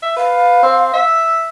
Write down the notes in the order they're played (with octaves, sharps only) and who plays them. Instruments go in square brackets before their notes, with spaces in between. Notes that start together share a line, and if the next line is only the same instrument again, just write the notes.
[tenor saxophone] E5
[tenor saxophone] B4 [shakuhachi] F5
[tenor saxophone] C4
E5